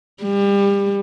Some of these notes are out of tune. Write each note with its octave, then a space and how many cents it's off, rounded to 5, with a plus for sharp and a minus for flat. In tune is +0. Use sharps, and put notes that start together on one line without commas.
G3 +30